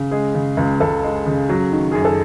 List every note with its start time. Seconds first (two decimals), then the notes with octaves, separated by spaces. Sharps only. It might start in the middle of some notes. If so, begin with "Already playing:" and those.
Already playing: C#3
0.11 G#3 G#4
0.34 C#3
0.57 C#2
0.80 C#2 A4
1.03 G#3
1.26 C#3
1.49 F#3
1.72 D#3
1.92 F#2 G#4
2.05 A4